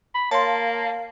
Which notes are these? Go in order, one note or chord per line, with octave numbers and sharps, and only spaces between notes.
B5
A#3 C#5 F5 A5 C6